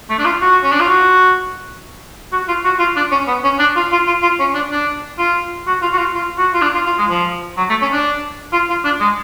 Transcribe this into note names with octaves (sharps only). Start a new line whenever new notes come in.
A3
D4
F4
F#4
C#4
D4
F4
F#4
F#4
F4
F#4
F4
D4
C#4
B3
C#4
D4
F4
F4
F4
F4
C#4
D4
D4
F4
F#4
F4
F#4
F4
F4
F#4
F4
D4
F4
F4
G#3
F3
F#3
A3
C#4
D4
F4
F4
D4
G#3